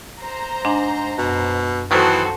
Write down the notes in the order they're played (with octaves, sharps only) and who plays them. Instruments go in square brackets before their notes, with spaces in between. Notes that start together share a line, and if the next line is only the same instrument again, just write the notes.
[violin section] C5 A#5
[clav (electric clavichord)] G#2 [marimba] D4
[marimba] F#2 [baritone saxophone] B2
[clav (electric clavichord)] D#3 F#3 B3 [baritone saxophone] E3 [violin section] F#4 A4 C5